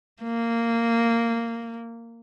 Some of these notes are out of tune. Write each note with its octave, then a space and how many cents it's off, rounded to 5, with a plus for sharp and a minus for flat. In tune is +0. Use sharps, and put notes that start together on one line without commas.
A#3 -15